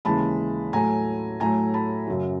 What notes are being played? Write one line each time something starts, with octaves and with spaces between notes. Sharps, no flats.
D#2 C#3 E3 G#3 A5 B5
A2 F#3 A3 G#5 A#5
A2 F#3 A3 G#5 A#5
A5 B5
F#2 C#3 F#3